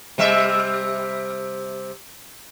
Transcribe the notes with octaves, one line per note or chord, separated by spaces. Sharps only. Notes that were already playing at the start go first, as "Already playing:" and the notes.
C3 G3 E5